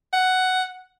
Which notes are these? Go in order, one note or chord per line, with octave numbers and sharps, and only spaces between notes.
F#5